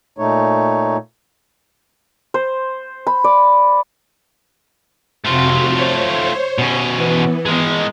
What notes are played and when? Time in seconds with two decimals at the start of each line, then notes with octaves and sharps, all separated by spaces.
0.18 A#2 A3 D#4 C#5
2.34 C5
3.07 B5
3.24 D5
5.25 F2 C3 A3 F4 F#4
5.69 C5 C#5
6.58 B2 C#4
6.91 E3 B3
7.46 G#3 A#4